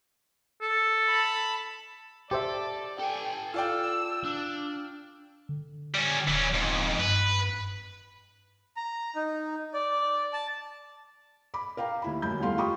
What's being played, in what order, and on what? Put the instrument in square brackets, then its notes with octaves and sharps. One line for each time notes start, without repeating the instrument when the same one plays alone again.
[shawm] A4
[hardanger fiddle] A5 B5
[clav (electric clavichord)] G4 C5 E5 [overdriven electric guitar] A4 [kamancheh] D5
[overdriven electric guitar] A4 G#5 [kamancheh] G5
[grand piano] F4 D5 G5 [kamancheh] E6
[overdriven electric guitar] D4
[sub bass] D3
[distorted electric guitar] G3 C#4
[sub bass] D#1 [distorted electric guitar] E3 C#4
[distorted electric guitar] F2 G#2
[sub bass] G2 [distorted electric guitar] B4
[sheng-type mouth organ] A#5
D#4
D5
A5
[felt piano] B5 D6
A#4 F5 G5 A#5
D#2 E4 B5
F#2 A#3 B5 G6
E2 E3 G3 A3 F5 C6
F4 G4 G5 B5 C#6 D#6